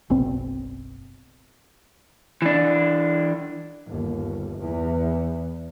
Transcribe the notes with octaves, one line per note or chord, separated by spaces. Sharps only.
F#1 B1 C4
E3 D4
G1 D#2
E2 E3